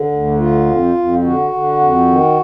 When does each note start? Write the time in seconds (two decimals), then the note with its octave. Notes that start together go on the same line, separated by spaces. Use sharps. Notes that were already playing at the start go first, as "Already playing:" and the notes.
Already playing: D3
0.11 D2
0.38 D3 F4
0.67 F2
0.95 F2
1.22 D3 F#4
1.51 D3
1.79 F2
2.07 D#3